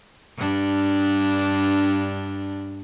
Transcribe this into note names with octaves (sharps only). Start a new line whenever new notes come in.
G2 D4